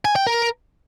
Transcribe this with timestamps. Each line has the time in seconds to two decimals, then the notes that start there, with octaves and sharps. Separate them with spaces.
0.05 G#5
0.16 G5
0.27 A#4